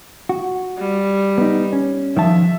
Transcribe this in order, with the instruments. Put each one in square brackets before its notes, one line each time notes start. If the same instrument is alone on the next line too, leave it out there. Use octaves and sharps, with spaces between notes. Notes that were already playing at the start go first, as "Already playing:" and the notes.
[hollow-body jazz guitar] F#4
[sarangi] G3
[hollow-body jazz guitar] B3 D#4
C#4
[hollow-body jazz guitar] D#3 F3 A5 [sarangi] E5